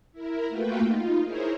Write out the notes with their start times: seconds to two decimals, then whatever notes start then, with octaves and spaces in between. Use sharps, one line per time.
0.13 E4 A#4
0.48 A3 A#3 F4 F#4 B4 G5
0.84 D#4 F4
1.22 E4 G#4 A#4 C5 C#5